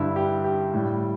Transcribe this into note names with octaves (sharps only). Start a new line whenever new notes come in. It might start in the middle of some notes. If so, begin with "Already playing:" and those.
Already playing: G2 D3 G3 E4
G4
G4
A2 G3